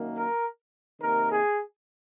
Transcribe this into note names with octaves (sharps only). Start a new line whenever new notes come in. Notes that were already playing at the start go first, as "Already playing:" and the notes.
Already playing: F#2 D#3 A#3
A#4
C3 D#3 A#3 A#4
G#4